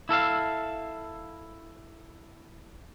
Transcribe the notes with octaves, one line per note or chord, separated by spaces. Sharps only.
E4 A4 E5 F5